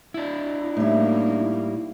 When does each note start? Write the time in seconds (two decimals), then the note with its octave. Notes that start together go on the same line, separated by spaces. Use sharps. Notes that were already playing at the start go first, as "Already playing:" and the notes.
0.14 D4 E4
0.77 A2 G3 A#3 D#4